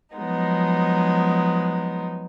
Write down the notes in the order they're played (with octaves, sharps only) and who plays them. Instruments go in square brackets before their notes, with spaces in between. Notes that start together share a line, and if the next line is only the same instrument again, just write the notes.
[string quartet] F3 F#3 G#3 B3 D#4